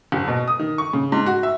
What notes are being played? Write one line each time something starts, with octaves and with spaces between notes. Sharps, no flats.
F#1
B2
D#6
D#3
C#6
C#3
G#2
F#4
E5